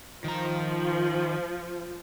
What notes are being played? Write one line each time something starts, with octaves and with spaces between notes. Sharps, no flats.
D#3 F3 A#5